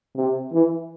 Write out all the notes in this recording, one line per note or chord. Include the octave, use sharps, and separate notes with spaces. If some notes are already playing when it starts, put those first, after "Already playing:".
C3
E3